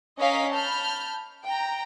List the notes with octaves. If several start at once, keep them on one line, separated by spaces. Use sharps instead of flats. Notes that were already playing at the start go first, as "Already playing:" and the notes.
C#4 A#4 D#5 F5 B6
A5 B5 F6 G6
G5 A#5